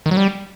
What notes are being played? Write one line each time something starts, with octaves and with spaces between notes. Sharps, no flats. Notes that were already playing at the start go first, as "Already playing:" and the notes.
D#3
F#3
G3